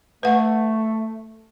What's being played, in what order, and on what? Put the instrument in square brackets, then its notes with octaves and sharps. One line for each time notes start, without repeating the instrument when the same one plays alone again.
[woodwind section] A3 [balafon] B4 F#5